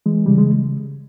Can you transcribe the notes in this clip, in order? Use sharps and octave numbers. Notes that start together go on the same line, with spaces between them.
E3 G#3
C#3 G3
G#3